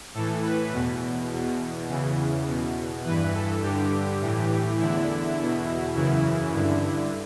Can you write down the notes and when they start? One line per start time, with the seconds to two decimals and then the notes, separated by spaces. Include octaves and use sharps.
0.14 A2 E3 A4
0.43 B4
0.73 E2 B2
1.30 E2 B2
1.89 E2 C#3 E3
2.47 E2 B2
3.04 G2 E3 B4
3.34 A4
3.63 G2 D3 G4
4.21 A2 E3
4.79 E2 D3 E4
5.37 E2 B2
5.95 F#2 C#3 E3 E4
6.53 G2 D3